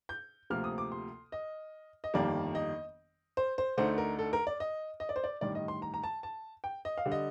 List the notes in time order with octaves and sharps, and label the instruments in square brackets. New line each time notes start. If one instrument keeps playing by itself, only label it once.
[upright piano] G6
D2 C3 F3 A#3 F6
D#6
D6
C6
D#5
D#5
G1 F2 D#3 G3 A#3 D5
D#5
C5
C5
D2 D3 A3 D#4 C5
A#4
A4
A#4
D5
D#5
D#5
D5
C5
D5
A1 G2 D#3 D5
D#5
C6
A#5
A#5
A5
A5
G5
D#5
F5
D3 G3
D#5